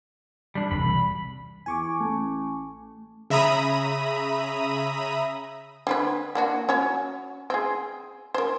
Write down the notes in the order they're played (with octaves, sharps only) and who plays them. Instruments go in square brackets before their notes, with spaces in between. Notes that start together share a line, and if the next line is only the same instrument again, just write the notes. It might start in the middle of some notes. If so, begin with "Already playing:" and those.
[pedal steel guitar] G3 D4
[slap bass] E1 C2 [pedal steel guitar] B5
[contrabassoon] E2 [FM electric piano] G#5 C#6 D6
[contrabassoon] A1 [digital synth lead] A3
[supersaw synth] C#3 E5 A#5 B5 D#6 D#7
[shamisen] D3 C4 B4
A#3 D4 F#4
C#4 F#4 C#5
C4 G#4
A#4 C5